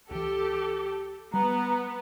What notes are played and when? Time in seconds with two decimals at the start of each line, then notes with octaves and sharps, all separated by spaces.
0.11 C#2 E3 G4 A4
1.34 G3 B3 A#5